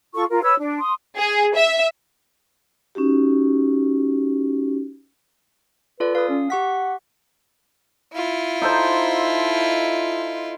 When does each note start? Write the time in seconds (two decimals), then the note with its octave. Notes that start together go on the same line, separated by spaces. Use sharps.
0.14 F4 A4 C#6
0.30 F4 A#4
0.42 B4 C#5 E6
0.59 D4
0.79 C6 D#6
1.17 G#4
1.55 E5
2.95 C#4 D#4 F#4 G4
6.00 F4 A4 B4 D5
6.15 B4 F5 D#6
6.29 C#4
6.50 G4 F#5 C#6 B6
8.13 E4 F4
8.62 D#4 A4 C5